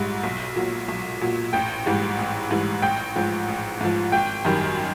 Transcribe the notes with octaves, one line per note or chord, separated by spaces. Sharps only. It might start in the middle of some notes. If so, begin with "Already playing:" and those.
Already playing: A#1 G#2 G3
B1
A#2 F#3
B1
A#2 F#3
A1 G5
G#2 E3 G3
A1
G#2 E3 G3
A1 G5
G#2 F3
A1
G#2 F3
G#1 G5
F#2 D#3 G3